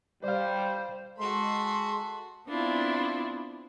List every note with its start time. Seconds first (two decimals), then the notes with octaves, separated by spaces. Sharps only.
0.24 G3 C5 D5 F5
1.19 G#3 F#4 A4 B5 C6
2.48 B3 C4 D4 E4 F4